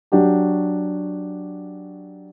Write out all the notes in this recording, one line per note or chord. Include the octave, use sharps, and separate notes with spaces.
F#3 D4 F#4 G4